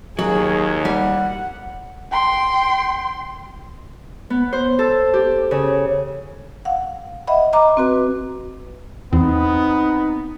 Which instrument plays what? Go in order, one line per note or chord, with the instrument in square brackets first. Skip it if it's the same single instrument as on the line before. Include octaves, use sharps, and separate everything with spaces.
[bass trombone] D#2 [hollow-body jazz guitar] F#3 [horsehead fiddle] G#4
[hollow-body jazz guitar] G3 [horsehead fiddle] F#5
[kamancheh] G5 C6
[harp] B3
C5
A4
G4
C#3
[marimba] F5 F#5
D#5 E5 F#5 B5
D#5 A#5 D6
C4 F#4 B4
[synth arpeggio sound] E2 [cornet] B3 [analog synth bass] C4 [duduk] D#4